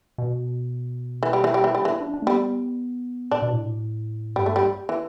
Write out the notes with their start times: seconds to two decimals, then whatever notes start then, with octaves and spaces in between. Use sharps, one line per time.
0.18 B2
1.23 E3
1.33 G3
1.44 E3
1.54 G3
1.64 E3
1.75 G3 D4
1.85 E3 E4
2.01 D4
2.14 D4
2.22 A3
2.27 G3 B3
3.31 A2 D4
3.42 B2
3.53 A2
4.36 G2 G3
4.46 A3
4.56 G3
4.89 E3